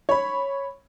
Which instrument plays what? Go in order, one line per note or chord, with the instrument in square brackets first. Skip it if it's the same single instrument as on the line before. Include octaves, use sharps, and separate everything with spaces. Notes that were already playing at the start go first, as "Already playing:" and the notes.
[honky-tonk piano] C#5 B5